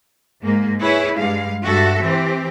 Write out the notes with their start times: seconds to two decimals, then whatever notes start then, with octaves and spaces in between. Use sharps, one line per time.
0.42 G#2 A#3
0.81 E4 G#4 B4 C#5
1.17 G2 G#3 F5
1.63 G2 F#4 A4 E5
2.03 E3 C4 G4